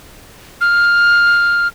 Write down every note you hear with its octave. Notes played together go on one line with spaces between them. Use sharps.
F6